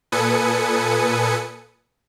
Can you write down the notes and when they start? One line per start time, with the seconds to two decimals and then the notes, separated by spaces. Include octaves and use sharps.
0.12 A#2 A4 B4 G#5 D#6 C#7